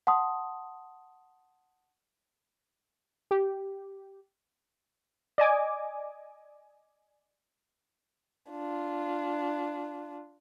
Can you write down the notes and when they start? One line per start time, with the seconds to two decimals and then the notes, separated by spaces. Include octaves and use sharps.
0.07 F#5 A5 C6 D#6
3.31 G4
5.38 D5 D#5 G#5 D6
8.51 D4 F4